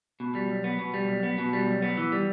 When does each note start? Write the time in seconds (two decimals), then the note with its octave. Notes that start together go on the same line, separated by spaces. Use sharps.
0.20 B2
0.35 G3
0.50 B1
0.64 B3
0.79 B2
0.94 G3
1.08 B1
1.23 B3
1.38 B2
1.53 G3
1.68 B1
1.82 B3
1.97 E3
2.12 G3